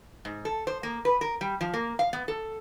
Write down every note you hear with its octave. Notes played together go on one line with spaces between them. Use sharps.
G#2
A4
C5
A#3
B4
A#4
G3
F3
A#3
F5
B3
A4